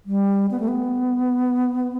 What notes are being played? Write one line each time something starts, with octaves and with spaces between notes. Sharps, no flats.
G3
B3
A3
B3